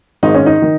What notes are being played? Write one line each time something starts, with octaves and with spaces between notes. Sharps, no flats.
G#1 G#2 D#3 D#4
C#4
D#4
D#3